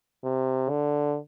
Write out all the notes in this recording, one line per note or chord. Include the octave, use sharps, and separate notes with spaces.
C3
D3